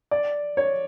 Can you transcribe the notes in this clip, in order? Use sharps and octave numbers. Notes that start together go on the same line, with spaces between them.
D5
C#5